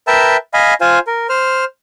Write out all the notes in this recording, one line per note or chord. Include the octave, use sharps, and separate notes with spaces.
A#4 B4 E5 G5 A5 E6
D#5 F5 G#5 B5
F4 C5 F5 G#5
A#4
C5 F6